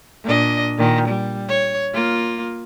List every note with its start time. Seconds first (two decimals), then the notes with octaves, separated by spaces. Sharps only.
0.24 A#2 D4 D#5
0.78 A#2 D#3
1.08 G3
1.49 C#5
1.93 A#3 F4